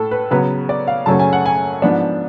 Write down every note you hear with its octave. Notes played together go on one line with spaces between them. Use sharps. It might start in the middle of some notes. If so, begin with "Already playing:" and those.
Already playing: A2 A3 A4
B4
C#3 F#3 B3 B4
D5
F5
F#2 C#3 F#3 A3 C#4 A5
G#5
F#5
G#5
G#2 F3 B3 D4